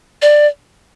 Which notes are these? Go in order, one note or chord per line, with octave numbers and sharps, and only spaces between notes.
D5